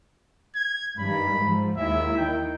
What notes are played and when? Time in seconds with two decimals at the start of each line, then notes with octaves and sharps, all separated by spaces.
0.55 G#6
1.00 G2 D#3 B5
1.34 G#2 F3
1.78 D#2 G#3 E4 E5
2.18 D#3 G5